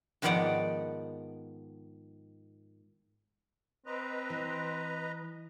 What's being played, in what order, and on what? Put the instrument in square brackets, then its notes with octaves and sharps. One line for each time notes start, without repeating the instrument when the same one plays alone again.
[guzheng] G#2 D#3 F3 B3 D5 F#5
[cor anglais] C4 [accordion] B4 D#5 A#5
[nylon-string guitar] E3